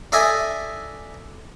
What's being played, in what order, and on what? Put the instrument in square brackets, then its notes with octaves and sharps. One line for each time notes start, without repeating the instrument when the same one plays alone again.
[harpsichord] D4 A4 D#5 E5 G#5